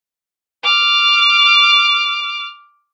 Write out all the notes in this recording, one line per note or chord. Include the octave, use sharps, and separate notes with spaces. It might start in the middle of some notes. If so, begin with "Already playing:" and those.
D6 F6